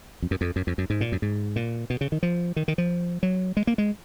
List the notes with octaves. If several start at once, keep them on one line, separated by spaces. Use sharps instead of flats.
F2
F#2
F2
F#2
F2
F#2
G#2
A#2
F#2
G#2
A#2
B2
C#3
D#3
F3
D#3
D#3
F3
F#3
G#3
A#3
G#3